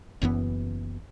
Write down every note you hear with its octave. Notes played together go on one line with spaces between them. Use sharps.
F#1 F#2 E3 B3